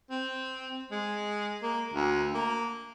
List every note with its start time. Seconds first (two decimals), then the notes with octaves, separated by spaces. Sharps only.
0.10 C4
0.91 G#3
1.62 A#3
1.93 D2
2.34 A#3